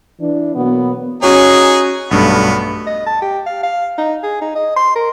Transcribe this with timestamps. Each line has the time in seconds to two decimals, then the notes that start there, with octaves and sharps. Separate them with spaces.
0.21 E3 D4
0.55 B2 F#3 A#3 B3
1.22 C#4 D#4 F#4 G#4 C#5
2.11 B1 G2 A3 B3
2.87 D#5
3.06 A5
3.22 G4
3.46 F5
3.63 F5
3.98 D#4
4.23 G#4
4.41 D#4
4.55 D#5
4.76 C6
4.96 A#4